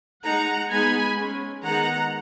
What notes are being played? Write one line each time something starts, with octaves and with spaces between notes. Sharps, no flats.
G#3 D#4 F#5 A#5
G#3 B3 D#4 G#5 B5
G#3 C#4
D#3 G#3 B3 D#4 F#5 A#5